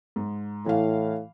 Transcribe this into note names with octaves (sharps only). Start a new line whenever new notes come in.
G#2
A2 E3 F5